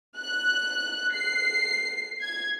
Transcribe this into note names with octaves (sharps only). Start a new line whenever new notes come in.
F#6
C7
G#6